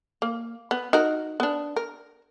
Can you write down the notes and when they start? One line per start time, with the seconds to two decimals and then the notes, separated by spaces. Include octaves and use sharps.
0.22 A#3
0.71 B3
0.93 D#4 F#4 A#4
1.40 B3 D4
1.76 A#4